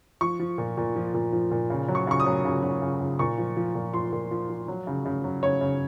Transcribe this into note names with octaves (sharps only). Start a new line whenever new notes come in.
F3 C#6
F3
A#2
A#2
F3
A#2
F3
A#2
C#3
F#3
C#6
C#3 C#6
D#6
F#3
C#3
F#3
C#3
C#3
A#2 C#6
F3
F3
A#2
F3 C6
A#2
F3
F3
F#3
C#3
C#3
F#3
C#3 C#5
C#3